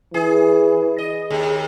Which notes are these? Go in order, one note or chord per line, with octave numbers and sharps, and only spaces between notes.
E3 G#4
D#5
D#2 G#4